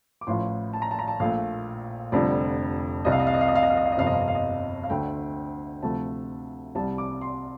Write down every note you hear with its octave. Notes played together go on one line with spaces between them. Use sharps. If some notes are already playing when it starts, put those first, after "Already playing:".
D6
A1 A2 F3 C6
A5
A#5
A5
A#5
A5
A#1 A#2 A3 F5
F1 F2 D3 G3 D5
C2 C3 G3 D#5
F5
D#5
F5
D#5
F5
D#5
F5
D#5
F5
D#5
F5
D#5
G1 F2 C3 F5
D#5
F5
D#5
F5
D#5
F5
D2 D3 A3 G5
D2 C3 F3 A3 A5
C2 C3 G3 A5
D6
C6